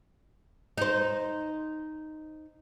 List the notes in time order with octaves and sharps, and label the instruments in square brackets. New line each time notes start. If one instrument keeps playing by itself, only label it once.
[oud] D#4 C5